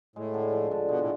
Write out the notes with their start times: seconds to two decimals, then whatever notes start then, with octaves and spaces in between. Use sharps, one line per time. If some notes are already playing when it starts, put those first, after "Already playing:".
0.16 A2 G#3
0.34 D3
0.52 F3
0.71 D3
0.89 B2 G#3
1.00 A2